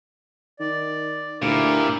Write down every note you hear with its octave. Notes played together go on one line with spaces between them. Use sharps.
D#3 D5
D2 A#2 E4 G4 A#4